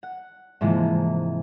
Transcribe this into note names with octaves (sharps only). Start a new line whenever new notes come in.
F#5
G#2 C3 E3 F3 G#3 A#3